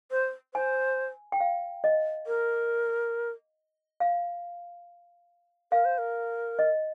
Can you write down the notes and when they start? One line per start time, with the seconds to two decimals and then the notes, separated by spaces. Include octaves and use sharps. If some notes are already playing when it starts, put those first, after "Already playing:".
0.11 C5
0.54 C5 G#5
1.32 G5
1.40 F5
1.84 D#5
2.27 A#4
4.00 F5
5.72 A#4 F5
5.85 C5
5.98 A#4
6.59 D#5